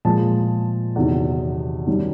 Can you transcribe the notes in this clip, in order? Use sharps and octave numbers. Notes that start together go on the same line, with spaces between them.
A#2 F3 G#3 A5
E2 C3 D#3 F#3
F#2 D#3 G3